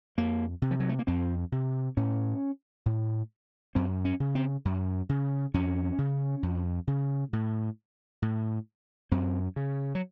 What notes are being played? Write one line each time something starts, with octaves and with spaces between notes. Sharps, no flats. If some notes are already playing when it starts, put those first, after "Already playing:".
F2 A#3
C3
F3
F#3
A3
A#3
F2 C4
C3
A2 C#4
A2
F#2 C4
C#4
C#3
C4
F#2
C#3
F2 C#4
C#3
F2
C#3
A2
A2
F#2 C4
C#3
F#3